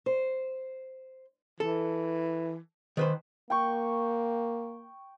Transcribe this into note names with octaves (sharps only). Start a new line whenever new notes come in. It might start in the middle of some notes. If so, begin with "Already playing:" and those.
C5
E3 A4
D#3 B4 C5
A#3 G5 C#6